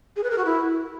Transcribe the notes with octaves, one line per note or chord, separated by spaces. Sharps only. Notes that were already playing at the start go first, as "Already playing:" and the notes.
G#4
B4
A#4
F#4
E4